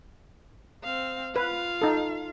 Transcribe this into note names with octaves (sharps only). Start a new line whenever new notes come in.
C4 F5
F4 B4 F5
D#4 A4